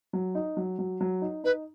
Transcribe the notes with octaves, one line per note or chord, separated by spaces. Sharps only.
F#3
D#4
F#3
F#3
F#3
D#4
D#4 B4